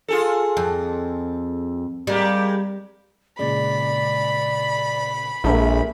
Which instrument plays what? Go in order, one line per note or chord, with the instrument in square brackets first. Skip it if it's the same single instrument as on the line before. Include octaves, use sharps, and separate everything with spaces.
[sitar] F4 G#4 A4
[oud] F2
[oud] G3 [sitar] G#3 A#3 G4
[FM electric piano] A#2 C#3 G#3 [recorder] D5 [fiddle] B5
[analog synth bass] A#1 [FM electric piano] G#3 A4 A#4 [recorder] E5